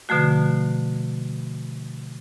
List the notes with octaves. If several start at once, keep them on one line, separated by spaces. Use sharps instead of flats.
B2 D3 F3 A3 F#4